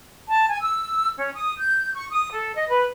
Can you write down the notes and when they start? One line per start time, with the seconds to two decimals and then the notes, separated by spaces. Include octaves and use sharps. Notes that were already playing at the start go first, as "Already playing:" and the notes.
0.27 A5
0.47 G#5
0.61 E6
1.18 C#4
1.35 D#6
1.58 G6
1.94 C#6
2.10 D#6
2.31 A4
2.55 D#5
2.69 B4